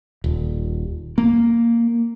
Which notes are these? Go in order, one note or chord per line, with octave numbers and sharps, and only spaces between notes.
D#1
A#3